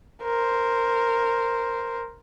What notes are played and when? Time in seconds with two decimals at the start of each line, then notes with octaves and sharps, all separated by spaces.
0.22 A#4 C5